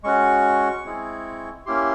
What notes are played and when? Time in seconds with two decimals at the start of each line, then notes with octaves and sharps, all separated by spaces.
0.04 G#3 C#4 F#4 C#6
0.85 G#3 C4 E4 G#4
1.66 A#3 C#4 E4 G4 C6